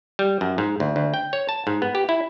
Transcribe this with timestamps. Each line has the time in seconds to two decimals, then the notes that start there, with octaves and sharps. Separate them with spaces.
0.19 G3
0.41 F#2
0.58 G#2
0.80 D2
0.96 D2
1.14 G5
1.33 C#5
1.49 A5
1.67 G#2
1.82 B3
1.95 G4
2.09 E4